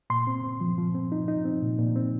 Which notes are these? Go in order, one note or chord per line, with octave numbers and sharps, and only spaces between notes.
A#2 C6
C4
C4
F3
F3
C4
D#4
D#4
C4
A#2
A#2
C4